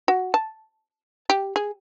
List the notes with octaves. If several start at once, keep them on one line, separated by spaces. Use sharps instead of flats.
F#4
A5
G4
G#4